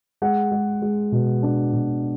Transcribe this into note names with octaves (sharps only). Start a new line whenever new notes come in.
G#3 F#5
G#3
G#3
B2
D4
B2